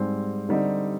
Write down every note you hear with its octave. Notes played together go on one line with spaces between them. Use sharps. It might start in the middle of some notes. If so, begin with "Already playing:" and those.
Already playing: G#2 G3 C4
D3 G3 C4 D#4